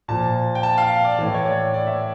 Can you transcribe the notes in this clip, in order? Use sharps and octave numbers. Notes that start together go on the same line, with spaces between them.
A#2 F3 A5
G5
A5
F5
D5
A2 E3
C#5
D5
D5
E5